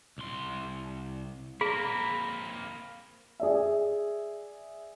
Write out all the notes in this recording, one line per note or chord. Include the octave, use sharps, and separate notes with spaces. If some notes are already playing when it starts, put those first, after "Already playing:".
C2 C6
A#3 C4 G#4 A#5 B5
G#4 D5 E5